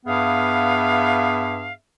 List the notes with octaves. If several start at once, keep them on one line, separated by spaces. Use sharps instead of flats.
G2 B3 G#4 E5 F5